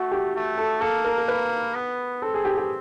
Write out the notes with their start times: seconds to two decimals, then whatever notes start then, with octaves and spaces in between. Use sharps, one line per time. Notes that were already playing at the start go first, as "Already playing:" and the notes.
Already playing: A3 F#4
0.12 G4
0.35 A3
0.58 A4
0.81 A#3 A4
1.04 A#4
1.18 A#4
1.28 B4
1.75 B3
2.22 C4 A4
2.34 G#4
2.45 G4
2.57 G4